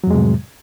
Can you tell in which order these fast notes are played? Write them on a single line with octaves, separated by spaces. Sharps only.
F#3 F2 G#3 C3 A2